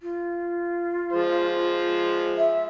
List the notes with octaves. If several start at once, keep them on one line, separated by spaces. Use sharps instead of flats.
F4
F3 G#3 C5
E5